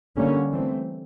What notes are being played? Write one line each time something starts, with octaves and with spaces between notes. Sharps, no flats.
D3 G3 A#3 C#4
E3 A3 C4